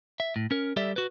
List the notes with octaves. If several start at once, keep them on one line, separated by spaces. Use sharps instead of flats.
E5
A2
C#4 A#4
G3 G4 A4 D5 E5
F#4 B4